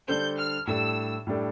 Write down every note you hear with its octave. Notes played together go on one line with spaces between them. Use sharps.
D3 G3 D4 A4 C5 G6
F6
A2 G3 D4 A4 E6
A2 G3 D4 A4